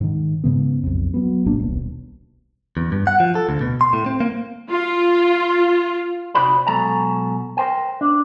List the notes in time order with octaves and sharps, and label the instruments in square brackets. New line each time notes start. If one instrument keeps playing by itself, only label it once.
[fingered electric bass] G#2 D#3
G#2 C#3 B3
B1 F2
F#3 B3
B1 A#2 A#3 D4
D#1 B1
[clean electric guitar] E2
G2
F#5
F3
A4
D2
B2
C6
A2
C4
A#3
[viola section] F4
[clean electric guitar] C3 D#4 F#4 C5 D5 B5
B2 F#3 G#3 A4 A5 A#5
A#4 C5 G5
D4